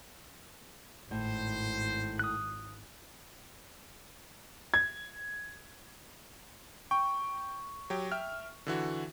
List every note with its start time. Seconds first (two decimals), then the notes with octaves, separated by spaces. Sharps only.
1.11 G#1 A2 C5
2.19 D#6 F#6
4.74 G#6
6.91 G5 C#6
7.90 F#3 G4 G5
8.12 E5 G5 F6
8.66 D3 E3 F#4